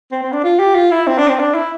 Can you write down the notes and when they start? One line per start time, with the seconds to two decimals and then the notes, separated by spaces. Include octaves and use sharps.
0.12 C4
0.23 C4
0.33 D4
0.44 F4
0.59 G4
0.75 F4
0.91 E4
1.07 C4
1.18 D4
1.28 C4
1.39 D4
1.55 E4